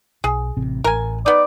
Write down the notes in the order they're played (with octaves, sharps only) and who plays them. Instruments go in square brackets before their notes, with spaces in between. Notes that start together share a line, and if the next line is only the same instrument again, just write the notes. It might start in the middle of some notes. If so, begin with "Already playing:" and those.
[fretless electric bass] B1 [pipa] G#4
[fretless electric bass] A1 C3 C4
[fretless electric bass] A1 [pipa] A#4 G#5
[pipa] B3 D#4 [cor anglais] D5